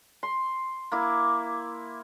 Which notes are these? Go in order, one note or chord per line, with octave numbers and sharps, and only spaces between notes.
C6
A#3 E4